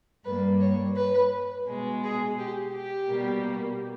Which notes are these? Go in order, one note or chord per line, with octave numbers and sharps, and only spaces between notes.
G2 G3 A#3 B4
C#5
B4
B2 G#3
G#4
G4
G4
B2 G3 A#3